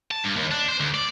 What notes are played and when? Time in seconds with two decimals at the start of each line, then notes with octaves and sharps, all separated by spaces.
0.11 A5
0.24 G2
0.36 D#2
0.51 D4
0.68 C5
0.80 D2
0.94 D5